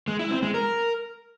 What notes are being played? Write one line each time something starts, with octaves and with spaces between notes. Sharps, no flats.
G#3
E4
C4
G#3
A#4